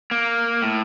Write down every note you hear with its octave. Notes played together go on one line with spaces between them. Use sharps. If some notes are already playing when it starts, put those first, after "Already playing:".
A#3
A2